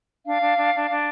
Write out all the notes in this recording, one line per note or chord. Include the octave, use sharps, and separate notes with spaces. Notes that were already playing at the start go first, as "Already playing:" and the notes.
D4 F5
D4
D4
D4
D4